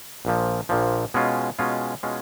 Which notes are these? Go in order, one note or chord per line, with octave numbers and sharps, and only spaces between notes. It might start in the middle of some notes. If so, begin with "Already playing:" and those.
A#1 A#2 F3
A#1 A#2 F3
B2 G#3 C#4 F4
B2 G#3 C#4 F4
B2 G#3 C#4 F4